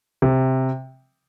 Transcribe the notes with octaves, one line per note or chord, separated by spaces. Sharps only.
C3